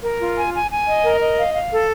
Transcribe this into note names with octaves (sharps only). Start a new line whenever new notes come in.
A#4
F4
G#5
G#5
G#5
D#5
A#4
D#5
F5
F5
A4